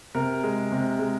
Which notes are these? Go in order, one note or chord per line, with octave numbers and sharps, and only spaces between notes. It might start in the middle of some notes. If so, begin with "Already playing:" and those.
C3 A#4
G#3
C3
G#3